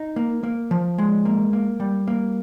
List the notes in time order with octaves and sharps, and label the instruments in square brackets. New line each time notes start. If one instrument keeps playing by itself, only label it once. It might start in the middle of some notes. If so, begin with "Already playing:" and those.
Already playing: [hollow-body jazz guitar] D#4
A#3
A#3
F3
G#3
A#3
A#3
G3
A#3